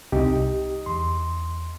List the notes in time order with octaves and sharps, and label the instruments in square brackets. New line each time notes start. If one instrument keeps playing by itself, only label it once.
[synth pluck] C2 [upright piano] D#4 [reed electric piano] G4
[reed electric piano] E2 C6